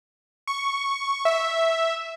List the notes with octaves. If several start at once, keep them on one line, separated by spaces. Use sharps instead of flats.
C#6
E5